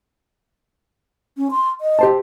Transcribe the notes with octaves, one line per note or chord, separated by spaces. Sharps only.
C#4
C6
D#5
G4 C5 A5